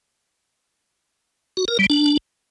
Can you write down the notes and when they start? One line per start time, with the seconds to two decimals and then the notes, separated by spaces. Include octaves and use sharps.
1.57 F#4
1.68 A#4
1.79 G3
1.90 D4